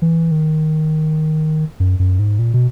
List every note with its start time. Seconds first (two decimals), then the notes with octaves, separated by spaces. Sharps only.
0.02 E3
0.31 D#3
1.80 F#2
1.99 F#2
2.19 G#2
2.39 A#2
2.54 B2